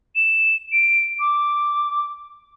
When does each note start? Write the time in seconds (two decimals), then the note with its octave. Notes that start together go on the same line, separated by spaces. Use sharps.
0.16 E7
0.72 D7
1.20 D6